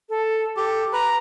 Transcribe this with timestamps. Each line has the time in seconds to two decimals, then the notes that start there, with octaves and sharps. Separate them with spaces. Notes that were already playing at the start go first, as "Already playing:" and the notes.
0.09 A4
0.57 G4 A4
0.93 B4 A#5